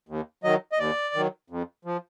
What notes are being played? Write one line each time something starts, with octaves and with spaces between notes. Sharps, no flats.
D#2
D#3 F#3 D#5
D#5
D#2 D5
D#3 F#3
F2
F3